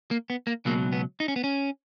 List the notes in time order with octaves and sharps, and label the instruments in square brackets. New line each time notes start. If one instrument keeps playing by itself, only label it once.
[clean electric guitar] A#3
B3
A#3
C#2 B2 F#3 A#3
B3
D#4
C#4
B3
C#4